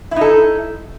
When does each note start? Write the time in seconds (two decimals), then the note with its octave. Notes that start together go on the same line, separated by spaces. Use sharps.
0.11 E4
0.16 D#4
0.21 A4